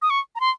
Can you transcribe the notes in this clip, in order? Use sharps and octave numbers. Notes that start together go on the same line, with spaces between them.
D#6
C#6
A#5
C6